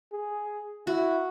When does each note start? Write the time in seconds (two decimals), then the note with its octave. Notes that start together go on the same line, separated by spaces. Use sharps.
0.12 G#4
0.87 E4 F#4